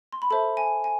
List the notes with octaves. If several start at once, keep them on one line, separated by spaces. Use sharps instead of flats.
C6
B5
A4 C5 E5 A5
G#5
G#5